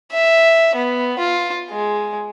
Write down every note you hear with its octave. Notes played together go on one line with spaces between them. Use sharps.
E5
B3
F4
G#3